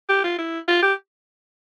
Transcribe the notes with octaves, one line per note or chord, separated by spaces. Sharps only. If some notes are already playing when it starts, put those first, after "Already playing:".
G4
F4
E4
F4
G4